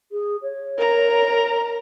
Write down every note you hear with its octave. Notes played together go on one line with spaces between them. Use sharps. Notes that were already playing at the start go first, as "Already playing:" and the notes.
G#4
C#5
A#4 A#5